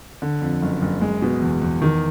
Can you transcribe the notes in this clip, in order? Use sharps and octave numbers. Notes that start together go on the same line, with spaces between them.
D3
F2
F#1
F#1
G#3
B2
E2
E2
D#3